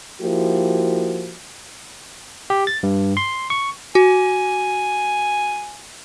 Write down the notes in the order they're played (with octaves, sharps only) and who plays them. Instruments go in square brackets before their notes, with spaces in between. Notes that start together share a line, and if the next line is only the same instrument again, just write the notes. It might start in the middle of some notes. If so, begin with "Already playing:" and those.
[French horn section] F3 A#3 E4 F#4 G4
[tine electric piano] G4
A6
G2
C6
C#6
[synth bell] F#4 [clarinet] G#5